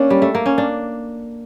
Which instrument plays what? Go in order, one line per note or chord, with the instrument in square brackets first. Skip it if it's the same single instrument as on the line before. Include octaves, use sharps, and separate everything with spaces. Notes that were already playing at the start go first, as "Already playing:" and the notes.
Already playing: [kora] A#3 D4 [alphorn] C#4
[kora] G3
A3
A#3
C#4
D4